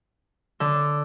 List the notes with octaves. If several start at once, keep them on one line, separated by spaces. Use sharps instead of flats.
D3